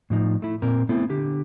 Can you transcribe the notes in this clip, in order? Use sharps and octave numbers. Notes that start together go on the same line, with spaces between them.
A2 F3 D#4
A3 E4
A#2 C4 A#4
A3 B3 C4 E4 A4
D3 G4